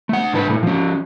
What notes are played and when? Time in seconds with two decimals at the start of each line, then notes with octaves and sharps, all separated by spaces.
0.09 A3 F#5
0.33 G#2 D3 D4 B4
0.49 A#2 A3
0.63 F3 C#4